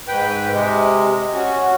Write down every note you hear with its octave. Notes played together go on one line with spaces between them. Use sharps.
G#2 B4 G5
C3 G#3
C#4 F#4